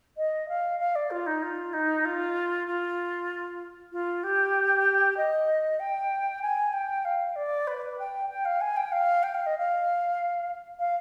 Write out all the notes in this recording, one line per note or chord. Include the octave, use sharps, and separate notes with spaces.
D#5
F5
F5
D5
F4
D#4
F4
D#4
F4
F4
F4
G4
D#5
G5
G#5
G5
F5
D5
B4
G5
G5
F5
G#5
G5
F5
G5
F5
D#5
F5
F5